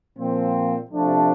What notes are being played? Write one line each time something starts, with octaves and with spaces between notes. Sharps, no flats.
A#2 F3 C4
C3 F3 A3 D4